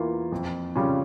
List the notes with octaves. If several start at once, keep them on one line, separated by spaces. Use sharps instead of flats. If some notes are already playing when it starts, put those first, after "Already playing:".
Already playing: E2 E3 A#3 F4
F2
C#3 G3 C#4 F4